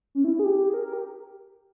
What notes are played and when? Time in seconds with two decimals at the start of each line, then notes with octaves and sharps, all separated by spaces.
0.15 C#4
0.24 E4
0.34 E4
0.39 G#4
0.44 G4
0.69 G#4
0.74 A#4
0.84 A#4
0.93 G4